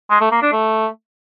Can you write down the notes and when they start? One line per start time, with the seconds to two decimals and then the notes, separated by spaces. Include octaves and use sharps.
0.11 G#3
0.21 A3
0.32 A#3
0.42 D4
0.53 A3